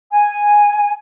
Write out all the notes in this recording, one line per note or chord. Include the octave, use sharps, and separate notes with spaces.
G#5